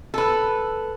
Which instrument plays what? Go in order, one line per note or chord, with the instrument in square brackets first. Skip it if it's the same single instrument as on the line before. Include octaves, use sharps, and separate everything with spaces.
[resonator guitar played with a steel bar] A4 B4